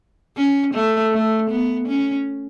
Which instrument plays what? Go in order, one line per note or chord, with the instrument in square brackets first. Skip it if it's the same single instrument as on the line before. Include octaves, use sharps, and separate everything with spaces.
[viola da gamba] C#4
A3
A3
B3
C#4